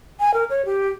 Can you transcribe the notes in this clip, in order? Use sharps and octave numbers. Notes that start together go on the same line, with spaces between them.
G#5
A#4
C#5
G4